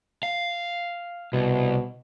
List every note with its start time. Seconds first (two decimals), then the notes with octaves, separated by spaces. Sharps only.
0.23 F5
1.33 C2 B2